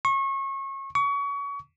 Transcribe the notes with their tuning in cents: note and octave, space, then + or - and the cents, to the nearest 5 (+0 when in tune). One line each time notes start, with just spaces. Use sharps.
C#6 -30
C#6 +30